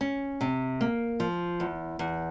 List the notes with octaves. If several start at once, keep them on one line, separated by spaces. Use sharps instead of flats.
C#4
C3
A#3
F3
E2
E2